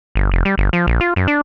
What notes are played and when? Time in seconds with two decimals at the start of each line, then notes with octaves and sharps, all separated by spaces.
0.15 G1
0.32 F1
0.45 G3
0.58 G1
0.73 F3
0.87 A#1
1.01 F4
1.16 F#2
1.28 D4